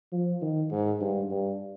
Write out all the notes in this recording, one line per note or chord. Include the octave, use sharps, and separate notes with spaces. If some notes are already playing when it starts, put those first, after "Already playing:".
F3
D#3
G#2
G2
G2